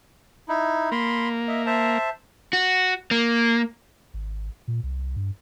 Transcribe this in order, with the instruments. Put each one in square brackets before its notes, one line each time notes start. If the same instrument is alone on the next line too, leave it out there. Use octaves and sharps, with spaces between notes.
[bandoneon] D#4 E4
[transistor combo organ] A#3 [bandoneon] B5 C6
[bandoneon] D#5 E5
C5 E5 A5
[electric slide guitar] F#4
A#3
[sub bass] G#1
A#2
C2
G2